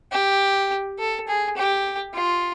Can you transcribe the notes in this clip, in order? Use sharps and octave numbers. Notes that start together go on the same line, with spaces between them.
G4
A4
G#4
G4
F4